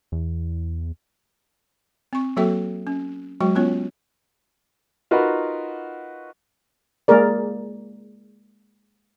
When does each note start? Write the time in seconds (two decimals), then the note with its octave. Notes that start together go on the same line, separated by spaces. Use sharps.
0.12 E2
2.13 C4 C#6
2.37 F#3 A#3 F#4 A4 E5 G5
2.87 C#4
3.41 F#3 G#3 F#4 G5
3.55 B3 C#4 F4 C#5
5.11 D#4 F4 F#4 A#4 B4
7.08 G#3 A#3 G#4 A#4 D5